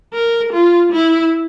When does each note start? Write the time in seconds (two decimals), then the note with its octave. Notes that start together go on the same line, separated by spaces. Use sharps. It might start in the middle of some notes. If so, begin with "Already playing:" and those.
0.14 A#4
0.53 F4
0.92 E4